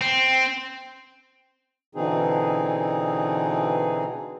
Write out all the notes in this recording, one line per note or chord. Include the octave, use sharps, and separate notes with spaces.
C4
B2 D3 E3 C4 D#4 G#4